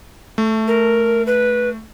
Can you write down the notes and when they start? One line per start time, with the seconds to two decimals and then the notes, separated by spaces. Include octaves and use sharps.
0.38 A3
0.67 A#4
1.27 B4